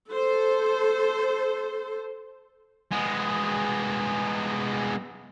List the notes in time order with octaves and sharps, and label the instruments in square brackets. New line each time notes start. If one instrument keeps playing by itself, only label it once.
[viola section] A4 C5
[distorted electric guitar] G#3 B3